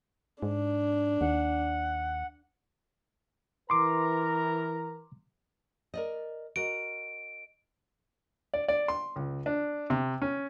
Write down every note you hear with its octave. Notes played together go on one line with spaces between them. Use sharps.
G#2 D4
D#2 F#5
E3 A#4 A#5 C6 D6
A#4 D5 D#5
F#4 A#4 D#5 D7
D5
D5
C6
C#2
D4
C3
C#4